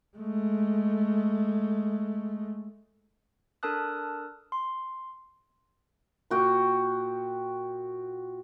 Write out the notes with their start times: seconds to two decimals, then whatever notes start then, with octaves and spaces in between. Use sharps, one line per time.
0.17 G#3 A3
3.63 D4 A4 A#4 A5 D#6 F#6
4.52 C6
6.30 A#2 F#4 G5